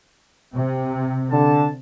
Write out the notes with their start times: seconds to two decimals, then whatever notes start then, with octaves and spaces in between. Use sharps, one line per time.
0.54 C3
1.31 D3 A5